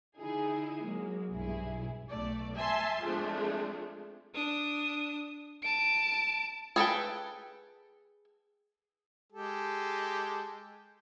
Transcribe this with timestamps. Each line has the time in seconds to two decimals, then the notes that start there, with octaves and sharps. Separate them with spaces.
0.18 D3 D#4 E4 G#4
0.83 F#3 G#3 A#3
1.33 B1 G2 E4 G#4
2.10 B1 A3 D5
2.55 E5 G#5 A5 C6
3.03 F3 G#3 A3 C4 D4
4.34 D4 D#6
5.62 A5 D7
6.76 G#4 A4 B4 G5
9.32 G#3 G4 A4